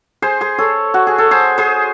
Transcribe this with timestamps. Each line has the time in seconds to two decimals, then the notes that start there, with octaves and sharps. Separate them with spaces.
0.22 G#4 C5
0.41 G#4 C5
0.59 A4 C#5
0.94 F#4
1.07 G#4
1.18 A4
1.31 G#4 C5
1.58 G#4 C5